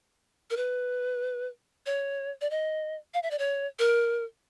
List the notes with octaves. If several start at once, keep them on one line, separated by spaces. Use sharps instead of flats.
A#4
B4
C#5
D5
D#5
F5
E5
D5
C#5
A#4